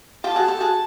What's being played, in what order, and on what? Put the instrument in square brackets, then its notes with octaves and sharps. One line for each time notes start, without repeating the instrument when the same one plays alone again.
[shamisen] F4 G4 [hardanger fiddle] A5
[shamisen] F#4 G#4
G4 A4
F#4 G#4